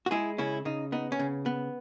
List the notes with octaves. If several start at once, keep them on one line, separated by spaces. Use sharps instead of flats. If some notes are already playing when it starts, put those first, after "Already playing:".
F#4
G#3 E4 G#4
C#3 C#4 E4
C#3 D#4
B3 D#4
C#4
C#3
B3